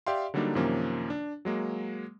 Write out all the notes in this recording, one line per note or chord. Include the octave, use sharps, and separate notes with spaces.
G4 D5 E5 F5 G5 C6
D3 F#3 G3 A#3 D4 D#4
F#2 C3 D#3 F3 A#3 C#4
D4
F#3 G#3 A#3